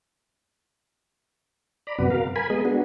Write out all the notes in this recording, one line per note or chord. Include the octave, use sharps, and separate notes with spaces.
D5 A#5 B5
F#2 C3 B3 F#4 B4
A#4 F5
A#4 G#5 B5
G#3 B3 G#4 D#5
B3 D4 F#4